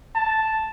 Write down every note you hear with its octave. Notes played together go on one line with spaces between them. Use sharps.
A5